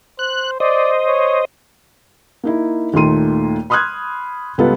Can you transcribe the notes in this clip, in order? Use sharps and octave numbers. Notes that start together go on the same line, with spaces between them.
C5 F#6
C5 D5 D#5
C#5
A#3 D#4 E4
D#2 A#2 D#3 A3 C6 D#7
B5 C6 D#6 F6 F#6 G#6
C#2 G3 B3 F4 A4